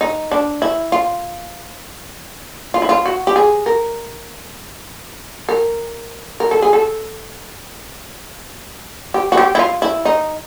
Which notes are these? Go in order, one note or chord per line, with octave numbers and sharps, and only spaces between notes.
D#4
D4
E4
F4
F4
E4
F4
F#4
G4
G#4
A#4
A#4
A#4
A4
G#4
A4
G4
F#4
G4
E4
F4
E4
D#4